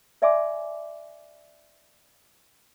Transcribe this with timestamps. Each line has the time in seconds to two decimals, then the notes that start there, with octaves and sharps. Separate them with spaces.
0.22 C#5 D5 E5 G#5 C6 D6